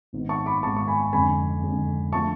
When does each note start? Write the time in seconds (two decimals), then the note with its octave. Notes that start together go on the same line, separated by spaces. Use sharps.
0.13 G#1 G#2 G#3 B3
0.29 A5 C#6
0.46 B5 D6
0.63 G#1 G#2 G#3 B3 A5 C#6
0.77 C#6
0.88 G#5 B5
1.13 F2 D3 G#3 C#4 G#5 B5
1.63 F2 D3 G#3 C#4
2.13 F3 A3 D4 A5 C#6